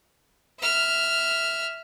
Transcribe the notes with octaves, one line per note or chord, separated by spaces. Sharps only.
E5 F6